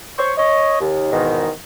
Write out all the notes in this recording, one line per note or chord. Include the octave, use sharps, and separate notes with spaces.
C5 C#5 C#6
C#5 D#5
D#2
E2 G#2 B2 D#3